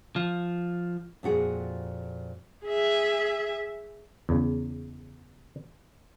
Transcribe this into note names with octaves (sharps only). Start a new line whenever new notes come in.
F3
F2 A#2 F#4 G#4
G#4 E5
E2 C#3